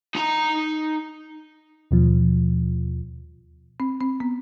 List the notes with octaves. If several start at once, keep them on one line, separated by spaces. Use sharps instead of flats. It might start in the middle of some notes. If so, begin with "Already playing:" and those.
D#4 A#5
D#2 B2 F3
C4
C4
B3